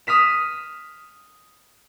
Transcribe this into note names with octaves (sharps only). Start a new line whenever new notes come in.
D#6 F6 B6 E7